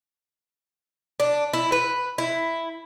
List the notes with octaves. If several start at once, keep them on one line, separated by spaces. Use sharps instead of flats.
D4
E4
B4
E4